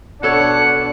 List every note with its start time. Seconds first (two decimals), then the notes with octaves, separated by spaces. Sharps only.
0.23 B2 D4 A4 C#5 F#5